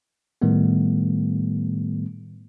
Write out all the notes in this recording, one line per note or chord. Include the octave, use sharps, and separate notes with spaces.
A2 D#3 G3 A3 B3